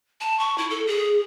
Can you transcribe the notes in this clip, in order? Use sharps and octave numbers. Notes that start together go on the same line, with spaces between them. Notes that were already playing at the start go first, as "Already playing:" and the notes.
A5
C#6
E4
A4
G#4